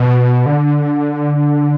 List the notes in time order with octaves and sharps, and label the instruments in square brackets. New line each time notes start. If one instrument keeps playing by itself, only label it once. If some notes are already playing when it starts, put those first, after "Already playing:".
Already playing: [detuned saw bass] B2
D3